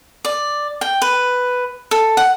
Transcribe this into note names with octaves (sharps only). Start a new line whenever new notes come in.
D5
G5
B4
A4
F#5